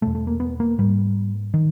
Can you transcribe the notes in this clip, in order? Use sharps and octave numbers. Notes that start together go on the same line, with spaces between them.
E2 B2 A3
A3
A#3
B3
A#3
G#2 G3
D#3